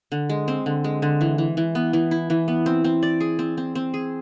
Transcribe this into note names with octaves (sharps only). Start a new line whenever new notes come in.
D3
G#3
C4
D3
G#3
D3
E3
E3
E3
B3
E3
E4
E3
B3
C4
C4
D5
G#4
C4
C4
C4
G#4